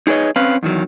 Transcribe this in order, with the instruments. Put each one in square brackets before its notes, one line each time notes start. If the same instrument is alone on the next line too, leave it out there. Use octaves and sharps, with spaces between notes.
[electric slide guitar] D#4 G#4 B4 C#5 D#5
C4 C#4 B4 F5
E2 D#3 F#3